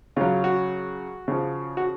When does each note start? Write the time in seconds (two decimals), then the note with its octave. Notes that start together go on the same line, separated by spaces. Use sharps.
0.16 C#3 F#3 F4
0.44 F#4
1.28 C#3 F3
1.77 F#4